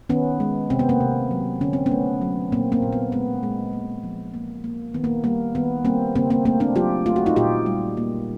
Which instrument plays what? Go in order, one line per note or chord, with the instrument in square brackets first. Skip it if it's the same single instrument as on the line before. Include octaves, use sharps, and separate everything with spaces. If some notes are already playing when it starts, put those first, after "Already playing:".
[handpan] D#3 B3 C#4
G#3
C3 C4
B3
A#3 C4
C3
F#3
D3 C#4
C4
B3 C#4
A3
F#3
A#2 A#3 C4
A#3 C4
A#2
B3
G#3 B3
G#3
A#3
F3
A#3
A#3
D#3 B3
A#3
G3 A#3
D#3 B3
G3 A#3 C4
C#3 A#3 C4
A#3 C4
A3 A#3 C4
C4 D4
F#3 F4 G4
A3 F4
F#4
D#4 F4
A#2 F4 G4
G3
A#3